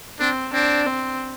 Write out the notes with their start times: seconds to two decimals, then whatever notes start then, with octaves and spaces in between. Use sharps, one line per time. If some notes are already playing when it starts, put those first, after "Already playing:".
0.19 C4 D4
0.53 C4 D4
0.86 C4